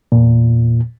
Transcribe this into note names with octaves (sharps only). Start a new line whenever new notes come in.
E2 A#2